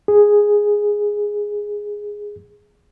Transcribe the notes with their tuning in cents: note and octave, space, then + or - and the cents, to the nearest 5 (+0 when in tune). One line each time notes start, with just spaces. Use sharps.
G#4 -5